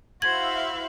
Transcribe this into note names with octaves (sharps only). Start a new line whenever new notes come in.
E4 F#4 C5 E5 F5 G#6 F#7